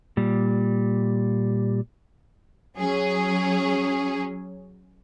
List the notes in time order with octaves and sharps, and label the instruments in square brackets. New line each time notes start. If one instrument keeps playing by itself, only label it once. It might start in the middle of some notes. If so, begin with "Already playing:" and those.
[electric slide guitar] A#2 G3
[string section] F#3 C#4 G#4